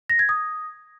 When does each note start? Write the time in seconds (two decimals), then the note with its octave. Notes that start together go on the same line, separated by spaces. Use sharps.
0.10 A#6
0.19 G#6
0.29 D#6